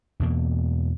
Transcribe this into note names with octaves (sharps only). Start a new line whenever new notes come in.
E2 B2 A#3